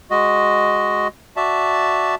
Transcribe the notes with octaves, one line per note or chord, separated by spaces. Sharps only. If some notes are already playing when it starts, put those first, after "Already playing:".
G#3 F#4 D#5
F#4 D5 E5 A5